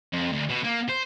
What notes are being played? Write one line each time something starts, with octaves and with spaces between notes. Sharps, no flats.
F2
D2
B2
A#3
C5